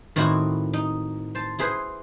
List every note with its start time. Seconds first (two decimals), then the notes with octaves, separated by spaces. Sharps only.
0.16 A2 D#3 C4 D#4 E4 F#4
0.73 D#4
1.35 C5 A5
1.59 E4 G#4 B4 C5